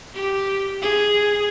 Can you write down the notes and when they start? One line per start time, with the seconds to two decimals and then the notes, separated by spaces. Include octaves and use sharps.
0.14 G4
0.82 G#4